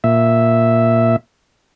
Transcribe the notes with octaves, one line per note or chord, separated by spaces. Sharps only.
A#2 E5